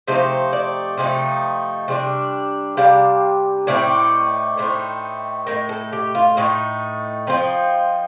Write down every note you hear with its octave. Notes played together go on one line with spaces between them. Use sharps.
C3 F3 A3 D#4 C5
D5
C3 F3 A3 D#4
C3 G3 D4
C3 G3 D4 F5
A2 A3 C4 D#4 D5
A2 A3 C4 D#4
A2 A3 D#4 A#4
A4
G4
F4
A2 A3 D#4
F3 C4 D#4